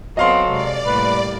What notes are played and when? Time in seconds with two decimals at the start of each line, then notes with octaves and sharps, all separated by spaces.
0.17 F#3 B3 C4 A4 D#5 F5 C6
0.50 C3 G#3 D5
0.86 A2 G3 A#3 B4